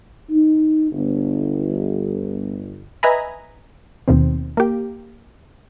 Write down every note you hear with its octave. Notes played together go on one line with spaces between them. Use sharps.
D#4
G1
B4 D#5 E5 G#5 A#5 B5
D#2 B2 D#3 C4
A#3 G4